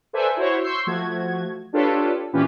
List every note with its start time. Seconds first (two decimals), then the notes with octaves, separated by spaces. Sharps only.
0.13 A4 B4 C5 D5 E5 G#5
0.36 E4 F#4 C5 C#5
0.62 C6 C#6 E6 G6 C7
0.87 F3 A3 F#4 G#6
1.73 D4 F4 G4 A4 B4 C#5
2.33 A#2 E3 C#4 F4 G4 B4